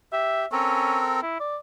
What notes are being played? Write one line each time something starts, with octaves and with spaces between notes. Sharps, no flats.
G4 E5
C4 C#4 A4 A#4
E4
D5